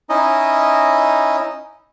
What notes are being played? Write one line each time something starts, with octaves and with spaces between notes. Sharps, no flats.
C#4 D#4 E4 D#5